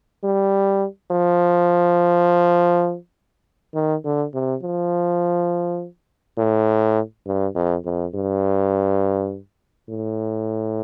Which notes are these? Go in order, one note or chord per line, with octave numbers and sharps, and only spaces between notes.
G3
F3
D#3
D3
C3
F3
A2
G2
F2
F2
G2
A2